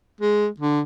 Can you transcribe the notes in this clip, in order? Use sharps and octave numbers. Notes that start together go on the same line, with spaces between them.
G#3
D3